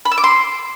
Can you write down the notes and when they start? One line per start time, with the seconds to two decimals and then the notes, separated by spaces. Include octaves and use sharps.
0.05 B5
0.11 E6
0.18 D6
0.24 C6